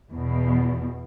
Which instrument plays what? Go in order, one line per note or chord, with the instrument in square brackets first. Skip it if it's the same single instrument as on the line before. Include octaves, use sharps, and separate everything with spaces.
[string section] E2 B2